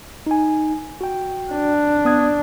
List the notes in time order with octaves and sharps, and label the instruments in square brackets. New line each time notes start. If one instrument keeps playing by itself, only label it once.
[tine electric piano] D#4 G#5
F#4 G5
[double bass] D4
[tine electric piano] B3 D#6 G#6